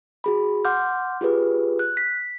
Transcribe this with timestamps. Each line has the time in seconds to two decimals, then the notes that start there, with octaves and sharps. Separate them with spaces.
0.24 F#4 G#4 B5
0.65 F#5 C6 D6 F6 G6
1.21 F4 G4 G#4 B4
1.79 F#6
1.97 B6